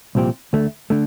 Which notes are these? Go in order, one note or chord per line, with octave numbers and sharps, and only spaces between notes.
C2 A#2 F3 C4 G4
D2 D3 A3
D3 A3